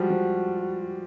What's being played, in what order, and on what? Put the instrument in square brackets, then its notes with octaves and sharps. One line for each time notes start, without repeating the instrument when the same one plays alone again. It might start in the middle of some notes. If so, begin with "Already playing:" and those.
Already playing: [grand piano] F3 G3 G#3 [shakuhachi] F#4
[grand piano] F3